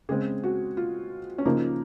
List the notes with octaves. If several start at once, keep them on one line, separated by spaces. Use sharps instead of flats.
C#3 G#3 C4 G#4
F#4
F4
C#4
C#3 F3 A#3 D#4